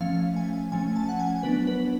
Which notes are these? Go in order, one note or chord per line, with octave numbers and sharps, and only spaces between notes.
F3 A3 C#4 F5
G#5
F3 A3 C#4 G#5
A5
F#5
G#5
F#3 B3 D4 B4
B4